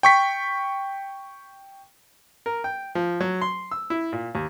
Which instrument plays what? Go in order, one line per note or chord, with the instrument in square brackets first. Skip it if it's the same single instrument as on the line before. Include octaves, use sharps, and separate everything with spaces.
[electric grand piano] G5 C#6 B6
[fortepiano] A#4
G5
F3
F#3
C6
E6
E4
A#2
D#2